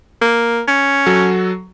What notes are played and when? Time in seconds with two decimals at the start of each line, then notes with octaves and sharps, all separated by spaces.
0.21 A#3
0.68 C#4
1.06 F#3 F#4 A4